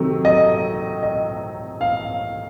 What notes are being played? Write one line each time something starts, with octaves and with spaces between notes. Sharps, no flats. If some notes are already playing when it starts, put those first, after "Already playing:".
Already playing: C3 D#3 F#3 A3
D#5
D#5
F5